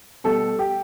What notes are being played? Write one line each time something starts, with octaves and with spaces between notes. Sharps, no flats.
B2 G3 A4
G4